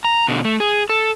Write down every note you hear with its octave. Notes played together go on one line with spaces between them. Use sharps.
A#5
B2 D3
A3
G#4
A4